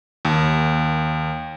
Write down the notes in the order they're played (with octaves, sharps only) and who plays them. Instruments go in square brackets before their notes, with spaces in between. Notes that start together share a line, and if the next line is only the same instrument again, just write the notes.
[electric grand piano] D#2